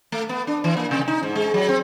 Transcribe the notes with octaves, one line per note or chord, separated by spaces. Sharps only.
A3
B3
D4
E3
A#3
C3
D#4
G#2
G#3
F#3
C4